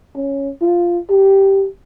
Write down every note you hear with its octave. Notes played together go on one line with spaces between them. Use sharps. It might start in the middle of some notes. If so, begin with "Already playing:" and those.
C#4
F4
G4